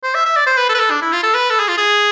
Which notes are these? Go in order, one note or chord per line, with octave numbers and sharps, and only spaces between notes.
C5
E5
E5
D5
C5
B4
A4
B4
A4
D4
E4
F4
A4
B4
A4
G#4
F4
G#4